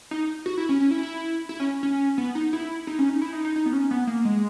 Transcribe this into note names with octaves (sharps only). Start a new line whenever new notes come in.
D#4
F#4
E4
C#4
C#4
E4
E4
E4
C#4
C#4
B3
D#4
E4
D#4
C#4
D#4
E4
D#4
D#4
D#4
B3
C#4
B3
A#3
G#3